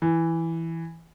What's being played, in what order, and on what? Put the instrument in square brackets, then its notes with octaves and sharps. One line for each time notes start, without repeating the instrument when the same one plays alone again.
[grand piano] E3